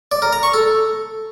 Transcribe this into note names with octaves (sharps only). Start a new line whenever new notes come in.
D5
A#4
A#5
C#6
A4